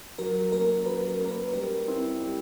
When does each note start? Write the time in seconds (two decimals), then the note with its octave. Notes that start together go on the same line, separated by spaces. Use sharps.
0.18 F#3 A#4
0.52 A#3 C#4 A#4
0.86 F#3 B4
1.08 A#4
1.20 A#3 C#4 A#4
1.31 B4
1.53 G3 A#4
1.88 C4 E4
2.21 G3